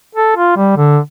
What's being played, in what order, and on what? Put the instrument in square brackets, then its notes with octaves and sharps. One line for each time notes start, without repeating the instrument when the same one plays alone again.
[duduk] A4
F4
G3
D3